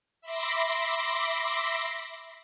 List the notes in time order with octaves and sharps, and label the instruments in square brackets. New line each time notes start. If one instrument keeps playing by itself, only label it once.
[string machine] E5 B5 C6 D6 A#6